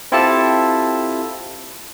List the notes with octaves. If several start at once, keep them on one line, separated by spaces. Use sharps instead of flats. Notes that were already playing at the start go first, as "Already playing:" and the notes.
C4 E4 F4 G4 A4 A5